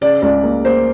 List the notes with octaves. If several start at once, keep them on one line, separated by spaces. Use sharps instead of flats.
C#3 D5
C#2 D5
A#3
A#3 C5